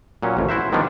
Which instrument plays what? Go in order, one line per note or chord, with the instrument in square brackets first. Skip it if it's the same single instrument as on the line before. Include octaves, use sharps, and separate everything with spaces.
[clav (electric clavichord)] A#2 F#3 C#4
A1 F2 B2
E4 F#4 C5 E5
D#3 F3 G3 B3 D4